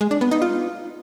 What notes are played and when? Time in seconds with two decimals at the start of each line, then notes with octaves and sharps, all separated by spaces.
0.01 G#3
0.11 D4
0.21 B3
0.31 D#4
0.42 F4